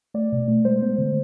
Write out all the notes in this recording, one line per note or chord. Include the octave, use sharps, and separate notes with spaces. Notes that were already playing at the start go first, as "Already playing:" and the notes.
A3 D5
B2
A3
G#3 C5
B3
D3